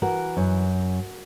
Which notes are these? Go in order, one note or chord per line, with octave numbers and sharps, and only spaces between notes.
E3 F#4 A#4
F#2